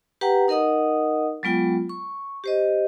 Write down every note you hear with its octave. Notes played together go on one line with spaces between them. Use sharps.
G4 B4 F#5 G5 A#5
D#4 A#4 D#5 F#5 D#6
F#3 G#3 B3 F4 G5
C#6
G4 C5 D#5